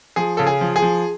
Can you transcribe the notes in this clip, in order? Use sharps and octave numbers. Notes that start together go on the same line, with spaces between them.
F3 G#4
C#3 A4
G#4
F3
G#4
F3